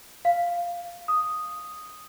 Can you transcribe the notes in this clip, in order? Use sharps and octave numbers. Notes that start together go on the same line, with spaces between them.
F5
D#6